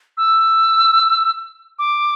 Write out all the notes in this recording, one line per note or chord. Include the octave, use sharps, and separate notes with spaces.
E6
D6